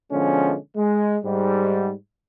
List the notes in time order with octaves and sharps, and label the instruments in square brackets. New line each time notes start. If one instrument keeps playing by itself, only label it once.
[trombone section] B2 D3 F3 G#3 C#4
G#3
G#2 G3